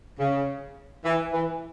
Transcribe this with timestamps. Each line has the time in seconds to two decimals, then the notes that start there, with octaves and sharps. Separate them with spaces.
0.19 C#3
1.05 E3
1.33 E3